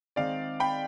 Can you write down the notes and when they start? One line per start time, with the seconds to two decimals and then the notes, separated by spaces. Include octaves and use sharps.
0.16 D#3 G#3 C4 D#4 D5 F5
0.60 G5 B5